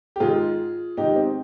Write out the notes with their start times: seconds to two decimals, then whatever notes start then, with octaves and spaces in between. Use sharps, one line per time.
0.16 G4
0.20 G#2 D#3 F4 G#4
0.97 G#2 D#3 D#4 G4
1.16 C4